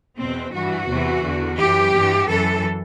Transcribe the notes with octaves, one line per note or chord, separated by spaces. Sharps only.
E2 B2 C4
G2 E3 F#4
E2 C3 E3
E2 D3
F#2 E3 G4
G2 E3
F#2 E3 A4